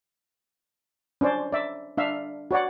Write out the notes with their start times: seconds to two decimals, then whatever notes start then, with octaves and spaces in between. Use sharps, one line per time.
1.21 C#4 D4 C5 D5
1.52 D5 E5
1.97 D4 E5 F5
2.51 F#4 C#5 D5 F#5